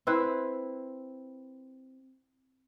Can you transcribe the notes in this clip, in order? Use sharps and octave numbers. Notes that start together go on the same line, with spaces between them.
C4 E4 B4 C5